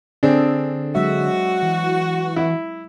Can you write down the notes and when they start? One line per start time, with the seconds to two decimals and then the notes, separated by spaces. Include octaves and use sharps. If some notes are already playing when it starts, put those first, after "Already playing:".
0.23 D3 C4 D4 G#4 A4
0.95 F#3 G#3 F#4 E5
1.63 E3
2.36 E4